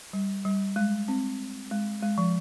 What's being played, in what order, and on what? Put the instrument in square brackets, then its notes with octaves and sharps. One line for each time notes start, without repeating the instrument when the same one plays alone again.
[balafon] G3
G3
G#3
C4
G#3
G#3
F3